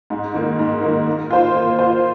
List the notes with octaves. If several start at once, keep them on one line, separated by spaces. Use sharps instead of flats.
G#2
D#3 A#3
G#2
D#3 A#3
A#3
F4 C5
A#3
F4 C5